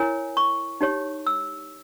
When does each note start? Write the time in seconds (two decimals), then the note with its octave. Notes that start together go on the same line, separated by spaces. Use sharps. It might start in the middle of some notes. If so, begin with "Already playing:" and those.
Already playing: E4 A#4 C#5 G#5
0.37 C#6
0.81 D#4 G4 C#5
1.27 E6